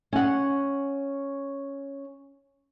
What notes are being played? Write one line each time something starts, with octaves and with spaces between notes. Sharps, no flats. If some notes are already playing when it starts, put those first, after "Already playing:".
C#4 F#5